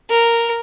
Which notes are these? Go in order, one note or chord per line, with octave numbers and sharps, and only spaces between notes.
A#4